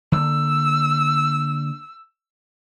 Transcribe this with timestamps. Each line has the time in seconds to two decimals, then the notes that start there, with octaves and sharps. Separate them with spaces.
0.12 D3 A#3 E6